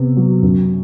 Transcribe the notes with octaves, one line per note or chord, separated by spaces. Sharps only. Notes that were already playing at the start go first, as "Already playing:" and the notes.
Already playing: C3 B3
F#3
F#2